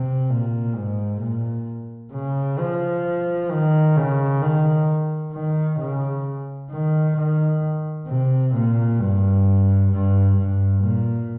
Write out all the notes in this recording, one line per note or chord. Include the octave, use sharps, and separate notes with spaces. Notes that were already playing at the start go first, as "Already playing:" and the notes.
Already playing: C3
A#2
G#2
A#2
C#3
F3
D#3
C#3
D#3
D#3
C#3
D#3
D#3
C3
A#2
G2
G2
G2
A#2